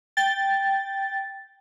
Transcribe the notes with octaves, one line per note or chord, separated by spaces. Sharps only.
G5 A6